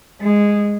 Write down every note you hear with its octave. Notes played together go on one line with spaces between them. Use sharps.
G#3